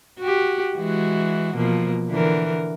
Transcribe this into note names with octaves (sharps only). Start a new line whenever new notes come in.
F#4 G4
E3 G#3 F#4
B2 F3 A#3
D3 E3 A#4